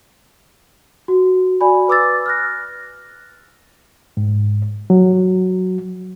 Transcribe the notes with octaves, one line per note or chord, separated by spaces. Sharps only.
F#4
F#4 D5 G#5 B5
B4 D6 E6 A6
F6 F#6 A#6
G#2
F#3